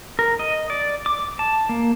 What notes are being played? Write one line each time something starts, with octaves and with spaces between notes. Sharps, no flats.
A#4
D#5
D5
D6
A5
A#3